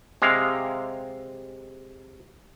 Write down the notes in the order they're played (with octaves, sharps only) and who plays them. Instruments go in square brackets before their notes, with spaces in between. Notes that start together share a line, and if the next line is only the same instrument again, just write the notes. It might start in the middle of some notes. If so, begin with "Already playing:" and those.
[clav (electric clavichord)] C3 G#3 F5